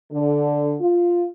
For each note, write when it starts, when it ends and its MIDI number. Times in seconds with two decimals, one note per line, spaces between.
0.12 0.74 50
0.80 1.25 65